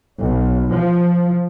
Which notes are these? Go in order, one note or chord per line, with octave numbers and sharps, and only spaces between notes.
B1
F3